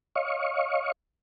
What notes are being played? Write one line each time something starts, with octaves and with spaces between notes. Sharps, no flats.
C#5 D#5 F5 C#6